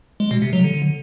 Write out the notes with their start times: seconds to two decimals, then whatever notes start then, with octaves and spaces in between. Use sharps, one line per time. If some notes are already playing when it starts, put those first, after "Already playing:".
0.20 G#3
0.31 B2
0.42 C3
0.53 F#3
0.64 D3